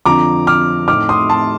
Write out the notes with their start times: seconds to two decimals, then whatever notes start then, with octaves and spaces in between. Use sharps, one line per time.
0.05 F2 D3 F3 A#5 D6
0.47 D6 F6
0.88 A2 A3 D#4 D6 F6
1.09 C6 D#6
1.30 A5 C6